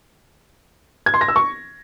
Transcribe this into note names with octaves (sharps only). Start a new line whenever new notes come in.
G#6
C6
A#6
E6
C#6